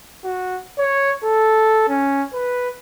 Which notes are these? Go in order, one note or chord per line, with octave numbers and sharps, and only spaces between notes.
F#4
C#5
A4
C#4
B4